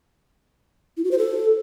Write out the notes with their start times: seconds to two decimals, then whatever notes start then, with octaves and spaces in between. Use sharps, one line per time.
0.97 E4
1.04 F#4
1.11 C5
1.18 A4